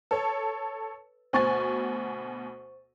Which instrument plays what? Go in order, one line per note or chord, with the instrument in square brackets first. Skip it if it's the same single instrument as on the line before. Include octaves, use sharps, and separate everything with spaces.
[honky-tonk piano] A4 C#5 [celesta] B4
[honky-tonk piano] D2 B2 G#5 [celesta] C5 C#6 A6